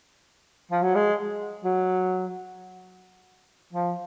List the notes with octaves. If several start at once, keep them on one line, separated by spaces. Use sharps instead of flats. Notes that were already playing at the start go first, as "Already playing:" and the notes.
F3
F#3
G#3
F#3
F3